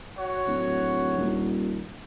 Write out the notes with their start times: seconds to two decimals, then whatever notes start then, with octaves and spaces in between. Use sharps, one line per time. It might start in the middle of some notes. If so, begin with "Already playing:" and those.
0.17 F#4 C#5 F#5
0.47 D1
1.18 D#1